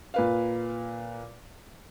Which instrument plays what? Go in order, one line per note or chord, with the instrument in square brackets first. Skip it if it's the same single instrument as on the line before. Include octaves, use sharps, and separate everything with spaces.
[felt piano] A#2 B4 F5